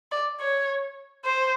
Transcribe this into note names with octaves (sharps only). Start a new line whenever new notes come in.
D5
C#5
C5